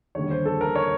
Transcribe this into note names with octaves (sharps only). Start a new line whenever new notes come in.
D#2 D3 G3 C#5
C5
A4
A#4
C#5